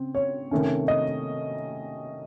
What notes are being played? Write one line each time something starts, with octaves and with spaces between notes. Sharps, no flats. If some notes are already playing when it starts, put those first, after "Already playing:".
Already playing: C#3 C4
C#5
C3 D#3 A3 C#4
D#5